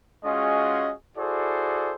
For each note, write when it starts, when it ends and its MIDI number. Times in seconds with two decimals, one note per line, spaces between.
0.24 0.92 56
0.24 0.92 61
0.24 0.92 65
0.24 0.92 66
0.24 0.92 68
0.24 0.92 75
1.17 1.95 64
1.17 1.95 66
1.17 1.95 68
1.17 1.95 69
1.17 1.95 72
1.17 1.95 74